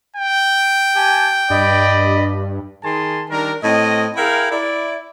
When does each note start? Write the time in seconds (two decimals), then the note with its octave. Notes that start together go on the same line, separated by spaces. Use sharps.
0.16 G5
0.95 G4 G#5 A5
1.50 G2 D5 D#5 B5
2.84 D#3 G#4 G#5 A5 C6
3.30 D#3 G3 D4 A#4
3.64 A2 C4 D#5
4.17 E4 G#4 A#4 F5 G5
4.52 E4 D5